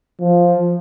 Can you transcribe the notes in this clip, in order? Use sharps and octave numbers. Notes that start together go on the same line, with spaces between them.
F3